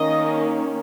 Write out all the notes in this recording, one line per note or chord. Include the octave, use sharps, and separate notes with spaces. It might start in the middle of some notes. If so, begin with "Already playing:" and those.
Already playing: D#3 A#3 C#4 D#5